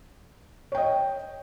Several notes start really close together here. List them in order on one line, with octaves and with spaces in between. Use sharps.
C#5 G5 D#5